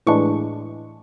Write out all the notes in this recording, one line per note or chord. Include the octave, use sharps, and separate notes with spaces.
A2 E3 G#3 D4 C#6